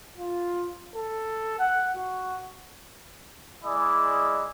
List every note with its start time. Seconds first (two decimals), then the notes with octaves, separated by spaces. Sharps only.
0.18 F4
0.96 A4
1.59 F#5
1.96 F#4
3.65 G#3 E4 G#4 D5 D#5